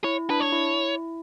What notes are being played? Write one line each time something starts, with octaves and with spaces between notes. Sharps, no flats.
E4 C#5
D4 B4
C#5
E4